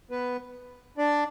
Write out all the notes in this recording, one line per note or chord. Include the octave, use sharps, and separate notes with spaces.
B3 B4
D4 D5